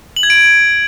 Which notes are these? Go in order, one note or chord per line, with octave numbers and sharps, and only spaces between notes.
F#7
G#6
D7